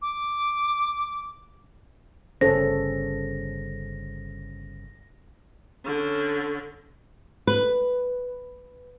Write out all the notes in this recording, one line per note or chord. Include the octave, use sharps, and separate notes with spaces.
D6
G1 C#3 C#4 A4 C5 A#6
D3 C#4
B4